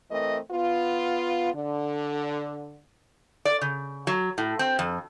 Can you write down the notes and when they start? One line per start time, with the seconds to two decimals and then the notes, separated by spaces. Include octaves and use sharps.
0.11 E3 A3 C4 A#4 D#5
0.51 B3 F4
1.53 D3
3.45 D5
3.61 C#3
4.07 F#3
4.38 A2
4.59 C4
4.79 F2